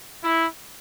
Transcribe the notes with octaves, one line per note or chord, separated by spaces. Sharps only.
E4